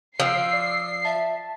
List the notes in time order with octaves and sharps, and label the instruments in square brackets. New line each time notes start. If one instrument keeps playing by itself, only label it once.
[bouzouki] F3 [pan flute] E6 [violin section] C7 [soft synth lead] D7
[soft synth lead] D5
[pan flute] E5 [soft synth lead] A5